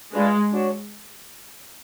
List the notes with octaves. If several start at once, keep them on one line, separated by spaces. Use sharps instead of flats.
G#3 D4 F4 B4 D5
D4 F#4 C#5